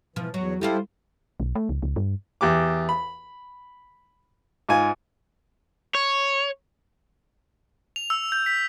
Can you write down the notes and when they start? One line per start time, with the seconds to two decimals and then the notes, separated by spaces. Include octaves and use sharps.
0.16 B2 E3 F3
0.34 E2 F#3 C#5
0.61 G3 E4 F4 G4 A4 C5
1.40 B1
1.55 A3
1.69 C#2
1.82 C#2
1.96 G2
2.41 E2 G4 D6
2.89 B5
4.69 G#2 F4 G#5
5.95 C#5
7.96 F7
8.10 E6
8.32 G6
8.46 B6